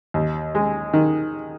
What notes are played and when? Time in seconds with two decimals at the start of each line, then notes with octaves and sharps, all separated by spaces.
0.14 D#2
0.55 G#3
0.93 D#3